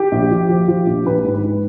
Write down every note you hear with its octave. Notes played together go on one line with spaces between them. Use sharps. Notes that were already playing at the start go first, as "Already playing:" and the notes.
Already playing: G4
A#1
F3
F3
F3
A#1
A#1 B4
G#2
B4
G#2